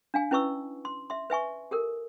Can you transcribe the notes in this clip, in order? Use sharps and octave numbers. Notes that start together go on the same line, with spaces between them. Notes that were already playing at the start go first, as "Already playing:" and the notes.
D4 F5 G#5
C#4 E4 B4 D#5 C#6 E6
C6
E5 C6
B4 E5 G#5 C#6
G4 A4 A#4